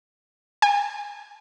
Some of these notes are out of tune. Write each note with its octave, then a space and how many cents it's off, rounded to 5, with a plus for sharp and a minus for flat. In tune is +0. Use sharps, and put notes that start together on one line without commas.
G#5 -35